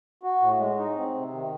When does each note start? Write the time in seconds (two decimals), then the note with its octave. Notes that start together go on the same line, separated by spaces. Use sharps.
0.23 F#4
0.41 A2
0.59 G#3
0.78 D#4
0.96 C4
1.14 C3
1.32 D#3